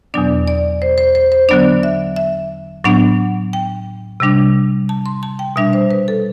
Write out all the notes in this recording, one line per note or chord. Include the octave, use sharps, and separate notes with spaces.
E2 B2 F#3 B3 D4 D5
D5
C5
C5
C5
C5
D3 F#3 B3 D4 D5
E5
E5
A2 F#3 B3 D4 F#5
G5
C3 G3 D4
A5
C6
A5
G5
B2 G3 D4 E5
C5
B4
A4